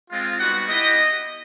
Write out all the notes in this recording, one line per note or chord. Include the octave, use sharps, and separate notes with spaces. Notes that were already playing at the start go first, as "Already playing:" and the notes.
G#3 C4 F4
G3 B3 D#4 F#4 F#5
B3 E4 G4 D#5